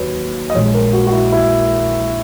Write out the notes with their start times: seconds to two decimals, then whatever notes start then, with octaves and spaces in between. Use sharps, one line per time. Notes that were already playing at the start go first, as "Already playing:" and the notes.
Already playing: D#2 D#3 F#3 B4 C#5
0.50 D#5
0.54 A#1 A#2 G#3 C#5
0.74 A#4
0.93 F#4
1.07 F#4
1.13 E4
1.32 E4